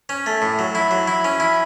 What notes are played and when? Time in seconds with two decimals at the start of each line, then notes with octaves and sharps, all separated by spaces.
0.09 C#4
0.26 A3
0.42 A2
0.59 F#3
0.75 E4
0.91 F#3
1.08 E4
1.24 C#4
1.40 E4